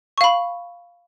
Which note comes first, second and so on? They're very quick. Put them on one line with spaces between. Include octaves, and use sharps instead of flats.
C#6 F5 B5